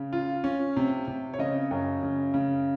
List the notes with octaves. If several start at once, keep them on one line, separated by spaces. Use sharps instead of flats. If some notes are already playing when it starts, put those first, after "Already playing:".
Already playing: C#3
F4
C#4
C3
C3
C#5
C#3 D#5
F#2
C#3
C#3